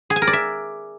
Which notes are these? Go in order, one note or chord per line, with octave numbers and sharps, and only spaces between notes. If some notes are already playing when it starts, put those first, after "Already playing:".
G#4
G#5
A#4
D5
E5